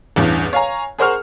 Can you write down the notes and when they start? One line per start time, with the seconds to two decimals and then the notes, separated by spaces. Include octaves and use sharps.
0.16 A1 E2 G2
0.53 C#5 F5 G#5 A#5
0.99 G#4 A#4 C5 F#5 C#6 F6